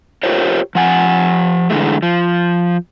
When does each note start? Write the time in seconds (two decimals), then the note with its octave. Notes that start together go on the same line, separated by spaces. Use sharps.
0.23 F4 G4 A#4 C5 C#5
0.75 F3 F#5 G#5
1.70 D3 E3 G#3 A3
2.03 F3